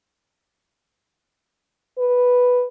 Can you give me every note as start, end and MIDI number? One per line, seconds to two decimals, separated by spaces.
1.99 2.65 71